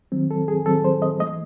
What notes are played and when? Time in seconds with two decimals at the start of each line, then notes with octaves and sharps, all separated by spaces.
0.12 D#3 F#3 C4
0.31 A4
0.48 G#4
0.66 D#3 F#3 C4 A4
0.84 C5
1.02 D#5
1.20 E3 A3 D#5